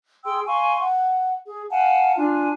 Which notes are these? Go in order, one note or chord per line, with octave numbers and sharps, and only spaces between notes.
G#4 G5 C6 E6
F5 G#5 C6 C#6
F#5
G#4
F5 F#5 G#5 A5
D4 F4 G#5